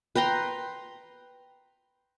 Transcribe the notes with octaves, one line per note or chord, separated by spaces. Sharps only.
B4 G5 A#5 C6